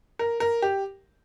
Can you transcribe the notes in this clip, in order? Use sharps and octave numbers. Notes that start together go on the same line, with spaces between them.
A#4
A#4
G4